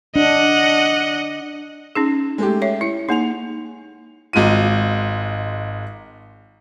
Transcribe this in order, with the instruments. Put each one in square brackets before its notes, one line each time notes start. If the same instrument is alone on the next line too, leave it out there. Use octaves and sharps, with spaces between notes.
[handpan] D4 [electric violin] D#5 F#5
[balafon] C#4 D#4 G#4
[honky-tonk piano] G#3 A3 G4
[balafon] C#5 E5
[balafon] E4 [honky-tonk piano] C#7
[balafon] A#3 D#4 [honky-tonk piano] G#4 F7
[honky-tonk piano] G#1 G#3 F4 D#7